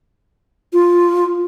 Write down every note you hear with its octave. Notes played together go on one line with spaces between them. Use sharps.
F4